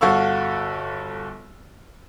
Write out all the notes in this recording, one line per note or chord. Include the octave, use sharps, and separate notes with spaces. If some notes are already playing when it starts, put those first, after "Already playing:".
G1 F#4 A4 F5 C#6 E6